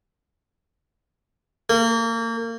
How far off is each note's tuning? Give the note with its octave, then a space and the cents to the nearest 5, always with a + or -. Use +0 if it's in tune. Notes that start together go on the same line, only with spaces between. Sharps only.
A#3 -30